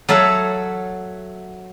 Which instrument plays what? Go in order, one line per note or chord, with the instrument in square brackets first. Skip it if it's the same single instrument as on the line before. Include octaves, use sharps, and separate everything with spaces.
[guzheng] F#3 A4 C#5 E5 F5